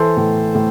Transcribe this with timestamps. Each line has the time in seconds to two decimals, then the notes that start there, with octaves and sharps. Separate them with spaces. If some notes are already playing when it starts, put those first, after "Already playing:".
Already playing: E3 A4 C5
0.17 A2
0.55 A2